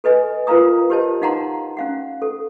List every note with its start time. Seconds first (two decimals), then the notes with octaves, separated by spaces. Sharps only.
0.04 A4 B4 D#5 G#5
0.47 F4 A#4 B4 F5 A#5 D#6
0.90 G4 A#4 C5 C#5 D#5 A5
1.22 D#4 F5 F#5 A5 A#5 C6
1.77 C#4 F5 F#5
2.22 A4